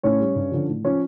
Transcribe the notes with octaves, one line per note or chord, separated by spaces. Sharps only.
A2 C#4 C#5
G3
G2
D3 F3
A2
F3 C#4 C#5